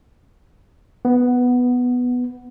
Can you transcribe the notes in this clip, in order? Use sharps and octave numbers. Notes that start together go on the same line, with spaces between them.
B3